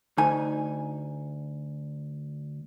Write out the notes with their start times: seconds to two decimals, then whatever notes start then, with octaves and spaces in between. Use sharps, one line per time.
0.18 D2 D#4 G#5